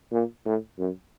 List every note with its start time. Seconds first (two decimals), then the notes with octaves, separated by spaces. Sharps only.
0.12 A#2
0.46 A2
0.79 F#2